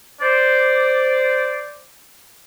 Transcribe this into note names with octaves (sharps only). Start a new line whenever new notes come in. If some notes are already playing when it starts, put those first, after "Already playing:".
C5 D5